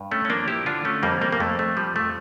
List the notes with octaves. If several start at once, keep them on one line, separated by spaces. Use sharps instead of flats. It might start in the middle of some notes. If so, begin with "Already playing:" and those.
Already playing: G2
A3 C#4
C#4
F3 A#3 D4
E4 G4
D3 D4 F4
A3 C#4
F2 G3 A#3
G3 A#3
A#3
F2 A3
A3
F3 G3
A3